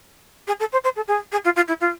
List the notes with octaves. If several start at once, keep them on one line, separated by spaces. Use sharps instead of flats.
G#4
A4
C5
C5
A4
G#4
G#4
F4
F4
E4
F4